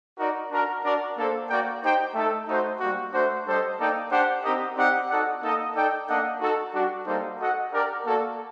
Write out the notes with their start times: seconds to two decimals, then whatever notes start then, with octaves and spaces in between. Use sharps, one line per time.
0.18 D#4 F#4 A#4 D5
0.51 D4 F#4 A#4
0.83 D4 F#4 A#4 D5
1.16 A#3 D4 A4 C5
1.49 A#3 F#4 A#4 D5 G5
1.82 D#4 G4 C5 G5
2.14 A3 D#4 A4
2.47 A3 D#4 F#4 C5
2.80 G3 A#3 F#4
3.13 A3 D4 F#4 C5
3.46 G3 D4 A4 C5 D#5
3.78 A#3 D#4 A4 D5 G5
4.11 D4 G4 C5 F#5
4.44 C4 D#4 G4 A#4 D#5
4.76 C4 D#4 G4 D5 F#5
5.09 D#4 F#4 A4 D5 F#5
5.42 A#3 D#4 A4 D#5
5.74 D#4 A4 D5 G5
6.08 A#3 D4 A4 D#5 F#5
6.40 D#4 F#4 A4
6.73 G3 D4 F#4
7.06 G3 A#3 D#4 A4 C5
7.39 F#4 A4 D#5 F#5
7.71 D4 G4 A#4 D5
8.04 A#3 F#4 A4 D5